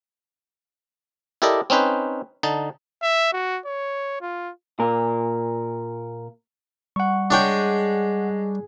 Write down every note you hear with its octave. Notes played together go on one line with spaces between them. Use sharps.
E4 G4 A4 A#4 D5 D#5
C4 C#4 D#4 B4 C5
D3 D#4 A5
E5
F#4
C#5
F4
A#2 A#4
G3 F#5 C#6
G#3 D4 C#5 G5